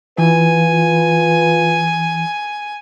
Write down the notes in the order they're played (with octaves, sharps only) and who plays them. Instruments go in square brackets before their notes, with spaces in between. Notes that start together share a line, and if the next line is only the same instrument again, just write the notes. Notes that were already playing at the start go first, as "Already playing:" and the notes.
[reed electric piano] E3 [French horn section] F4 B4 [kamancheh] G#5